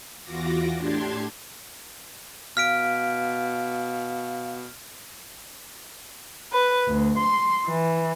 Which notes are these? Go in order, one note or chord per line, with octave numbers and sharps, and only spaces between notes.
E2 E3 F4 F#4 D6 A#6
A2 D4 G4 A5 C6 G#6
B2 F5 F6 B6 D7
B4
D2
C6
E3